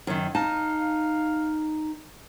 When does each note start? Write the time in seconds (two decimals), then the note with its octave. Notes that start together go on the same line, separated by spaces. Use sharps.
0.07 F#2 D#3
0.35 D#4 F5 A5